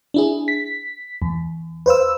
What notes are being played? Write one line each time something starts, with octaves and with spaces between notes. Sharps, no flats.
D4 E4 G#4
B6
E2
B4 C5 F5 E6